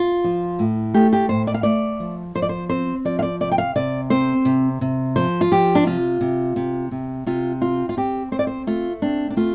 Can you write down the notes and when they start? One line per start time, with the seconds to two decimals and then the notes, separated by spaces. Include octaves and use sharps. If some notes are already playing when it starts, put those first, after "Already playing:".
Already playing: F4
0.24 F3
0.59 A2
0.94 A3 G4
1.13 G4
1.29 A2 C5
1.47 D5
1.54 F5
1.63 A3 D5
2.00 F3
2.35 F3 C5
2.42 D5
2.49 C5
2.70 C4 C5
3.05 F3 D5
3.19 F5
3.23 D5
3.41 C3 D5
3.52 G5
3.58 F5
3.76 C3 D5
4.10 C4 C5
4.45 C3
4.81 C3
5.16 F3 C5
5.41 F4
5.52 F3 G4
5.75 D4
5.86 C3 F4
6.21 C3
6.56 C3
6.91 C3
7.26 C3 F4
7.61 C4 F4
7.89 F4
7.97 C4 G4
8.32 C4 C5
8.39 D5
8.47 C5
8.67 A3 F4
9.02 C4 D4
9.30 D4
9.37 A3 F4